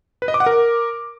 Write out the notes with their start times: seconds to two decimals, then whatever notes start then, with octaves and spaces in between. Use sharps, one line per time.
0.22 B4
0.28 D#5
0.34 D6
0.40 F#5
0.46 A#4